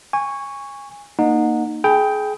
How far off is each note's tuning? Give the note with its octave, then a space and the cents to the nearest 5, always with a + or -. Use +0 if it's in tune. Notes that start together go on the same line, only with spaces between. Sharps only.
G#5 -25 C#6 +0
A#3 +0 D#4 -15 F#5 -25
G#4 +25 G5 +0 B5 +0